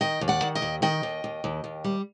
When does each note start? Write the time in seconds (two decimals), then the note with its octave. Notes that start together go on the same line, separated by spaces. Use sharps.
0.01 D#3 D#5 G5
0.21 D#2
0.28 D5 F#5
0.42 D#3
0.55 D#5 G5
0.62 D#2
0.82 D#3 D#5 G5
1.03 D#2
1.24 D#2
1.44 D#2
1.64 D#2
1.84 G3